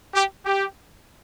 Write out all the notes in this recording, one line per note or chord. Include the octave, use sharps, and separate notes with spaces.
G4
G4